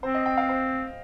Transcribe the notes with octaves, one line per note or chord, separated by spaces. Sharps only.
C4 C5
D#5
G5
F5
C5